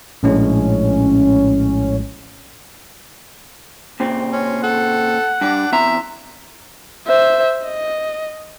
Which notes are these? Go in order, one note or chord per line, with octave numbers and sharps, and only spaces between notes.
A#1 A2 G#3 C#4
A#2 C#3 C4
C#4
A4 F#5
G2 D4
E2 C4 E5 A#5
C5 E5
D#5